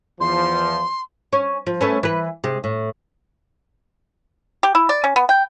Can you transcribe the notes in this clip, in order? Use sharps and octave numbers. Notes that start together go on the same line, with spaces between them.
E2 F3 C6
C#4
F3
A3 B3 C#4
E3 B4
C3 G#3
A2
G4
E4
D5
C#4
B3
G5